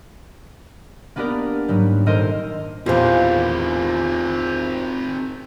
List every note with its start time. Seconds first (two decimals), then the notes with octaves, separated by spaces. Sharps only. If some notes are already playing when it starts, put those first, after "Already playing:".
1.16 A#3 B3 D4 G4 A#4 D5
1.68 G#2 F#3 G3
2.06 D#1 A4 A#4 C5 D#5 C6
2.86 E2 A#2 D#3 C4 F4 G4 G#4 C5